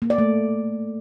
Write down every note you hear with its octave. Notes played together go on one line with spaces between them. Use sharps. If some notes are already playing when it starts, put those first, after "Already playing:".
A#3
D5
A3